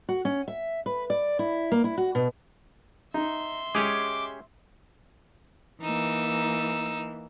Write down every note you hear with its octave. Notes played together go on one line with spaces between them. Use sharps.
F#4
C#4
E5
B4
D5
E4
A#3
E4
F#4
B2
D#4 E5 C6
G#3 C#4 G4 G#4 D6
E3 A#3 D#4 E6